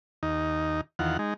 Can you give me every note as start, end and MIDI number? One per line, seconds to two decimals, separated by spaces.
0.23 0.81 39
0.23 0.81 63
0.99 1.17 40
0.99 1.17 51
0.99 1.17 65
0.99 1.17 78
1.19 1.34 56
1.19 1.34 63